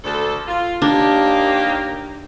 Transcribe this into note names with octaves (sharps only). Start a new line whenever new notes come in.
D2 A4
F4
D#2 A#3 D4 G4